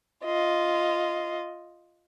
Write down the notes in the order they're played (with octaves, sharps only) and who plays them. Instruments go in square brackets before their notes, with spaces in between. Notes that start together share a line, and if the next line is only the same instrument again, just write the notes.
[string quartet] F4 D#5